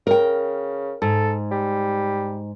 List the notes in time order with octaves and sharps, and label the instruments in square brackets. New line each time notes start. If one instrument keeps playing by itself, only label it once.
[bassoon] C#3 [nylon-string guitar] A#4 G5
[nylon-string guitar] G#2 [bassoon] A4
[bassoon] G3